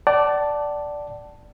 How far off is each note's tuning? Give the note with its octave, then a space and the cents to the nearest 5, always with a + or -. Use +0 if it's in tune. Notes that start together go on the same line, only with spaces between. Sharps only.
D5 +0 F#5 +45 A5 +0